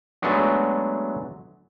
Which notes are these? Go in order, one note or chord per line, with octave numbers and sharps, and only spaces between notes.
F#3 G#3 A3 B3 D4 F#4